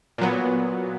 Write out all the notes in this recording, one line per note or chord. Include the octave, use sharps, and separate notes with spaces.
A#2 F#3 B3